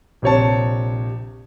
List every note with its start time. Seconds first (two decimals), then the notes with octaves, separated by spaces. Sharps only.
0.22 A#1 C3 C#5 A5